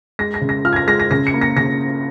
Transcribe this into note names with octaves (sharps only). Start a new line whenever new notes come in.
G#3 A#6
A#6
C#3
A#6
F4 F6
G#6
A#6
G#3 A#6
A#6
C#3 A#6
C#7
A#3
A#6
C#3 A#6